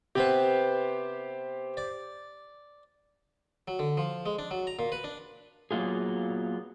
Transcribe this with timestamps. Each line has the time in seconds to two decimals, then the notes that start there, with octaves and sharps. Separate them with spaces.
0.15 C3 B3 G4 B4 C5
1.77 D5
3.68 F#3
3.79 D3
3.97 F3
4.26 G#3
4.39 D4
4.51 F#3
4.67 A#5
4.79 A#2
4.92 B4
5.04 D4
5.71 F#3 A#3 B3 F4 G#4